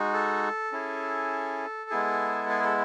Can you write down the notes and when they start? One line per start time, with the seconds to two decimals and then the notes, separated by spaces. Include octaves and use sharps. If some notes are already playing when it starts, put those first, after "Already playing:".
Already playing: G#3 D#4 F#4
0.14 A4
0.72 C#4 E4 G#4
1.90 G#3 B3 E4 G#4
2.49 G#4
2.64 A4